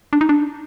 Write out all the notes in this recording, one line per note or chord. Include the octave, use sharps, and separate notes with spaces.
D4
D#4
D4